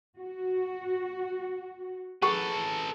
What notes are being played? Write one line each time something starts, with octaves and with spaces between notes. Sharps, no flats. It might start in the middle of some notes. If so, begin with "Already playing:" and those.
F#4
G#4 A4 B4 F#5 C#6